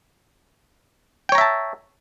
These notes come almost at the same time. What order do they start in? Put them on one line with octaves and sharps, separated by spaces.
G5 C#5 A#5 E5 A5